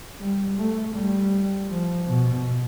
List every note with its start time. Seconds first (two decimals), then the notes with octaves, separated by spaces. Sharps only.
0.20 G3
0.57 A3
0.95 G3
1.70 F3
2.08 B2